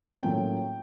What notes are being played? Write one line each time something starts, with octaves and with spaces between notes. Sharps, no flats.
A2 F#3 A#3 C#4 F4 G5